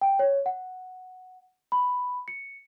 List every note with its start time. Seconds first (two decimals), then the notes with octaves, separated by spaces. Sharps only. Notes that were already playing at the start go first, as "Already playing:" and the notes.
0.01 G5
0.19 C#5
0.46 F#5
1.72 B5
2.28 C#7